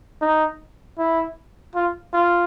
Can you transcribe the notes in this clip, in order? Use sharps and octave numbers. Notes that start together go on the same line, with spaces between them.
D#4
E4
F4
F4